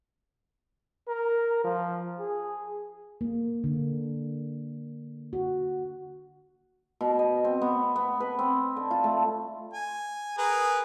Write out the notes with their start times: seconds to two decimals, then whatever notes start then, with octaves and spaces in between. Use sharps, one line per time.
1.08 A#4
1.65 F3
2.20 G#4
3.21 A#3
3.64 D3
5.33 F#4
7.01 B2
7.19 D#5
7.44 C4
7.62 B3
7.96 B3
8.20 B4
8.39 C4
8.77 D3
8.91 F4
9.04 A3
9.74 G#5
10.38 G#4 A#4 B4